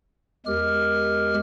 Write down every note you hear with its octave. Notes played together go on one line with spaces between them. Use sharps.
E2 G#3 G4 A#4 F6